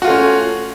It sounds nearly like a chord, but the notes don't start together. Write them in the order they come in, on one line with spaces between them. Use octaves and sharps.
F#4 F4 A3 C#4